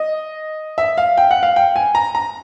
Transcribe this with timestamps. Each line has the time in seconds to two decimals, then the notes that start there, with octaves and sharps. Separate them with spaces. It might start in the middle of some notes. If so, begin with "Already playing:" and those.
Already playing: D#5
0.78 E5
0.98 F5
1.18 G5
1.31 F#5
1.43 F5
1.56 G5
1.76 G#5
1.95 A#5
2.15 A#5